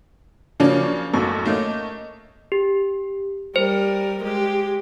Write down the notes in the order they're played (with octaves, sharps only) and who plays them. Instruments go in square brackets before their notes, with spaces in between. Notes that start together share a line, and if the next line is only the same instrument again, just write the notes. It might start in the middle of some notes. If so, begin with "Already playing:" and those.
[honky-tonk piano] C#3 F3 F#3 A#3 C#4 D4
A1 F#2 A2 A#3 A4 C#6
A3 A#3 C#4 D#5
[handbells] G4
[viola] G3 A#4 [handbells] C5
[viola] G#3 G4